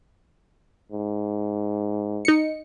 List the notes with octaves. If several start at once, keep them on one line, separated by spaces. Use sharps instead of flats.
G#2
D#4 C#7